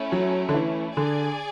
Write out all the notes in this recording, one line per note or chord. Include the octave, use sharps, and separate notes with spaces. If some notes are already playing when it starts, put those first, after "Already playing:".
Already playing: A3 C#4 E4
F#3
D3
E3
D3 G#4 D5 G#5